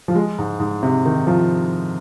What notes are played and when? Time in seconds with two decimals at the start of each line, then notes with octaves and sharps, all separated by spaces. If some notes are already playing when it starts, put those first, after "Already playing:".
0.08 F3
0.15 G#3
0.39 G#2
0.60 G#2
0.83 C3
1.05 D#3
1.27 F3